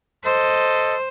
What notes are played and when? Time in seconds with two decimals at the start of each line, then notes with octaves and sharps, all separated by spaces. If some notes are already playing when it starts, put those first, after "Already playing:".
0.24 A4 C5 D#5